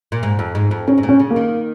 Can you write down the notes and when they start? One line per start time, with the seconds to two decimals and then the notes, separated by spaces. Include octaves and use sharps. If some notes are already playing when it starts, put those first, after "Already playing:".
0.12 A#2
0.23 G#2
0.39 F2
0.55 G#2
0.71 F2
0.88 G#2 C#4
0.98 G#2
1.03 A#2
1.09 C#4
1.19 C#3
1.31 A#3
1.36 D#3